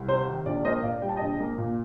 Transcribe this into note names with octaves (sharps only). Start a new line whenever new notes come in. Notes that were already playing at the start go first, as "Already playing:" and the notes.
Already playing: C2
C3 C5
D#3
A#1 D5
A#3 C5 D#5
A#2 D5 F5
G3 G5
A5
A#1 D#5 G5
A#3
A#2